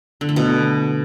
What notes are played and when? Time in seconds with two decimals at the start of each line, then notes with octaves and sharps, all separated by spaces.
0.21 D3
0.29 A3
0.36 B2